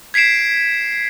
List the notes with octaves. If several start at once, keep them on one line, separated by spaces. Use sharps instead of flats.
G#6 B6 C7 D7 E7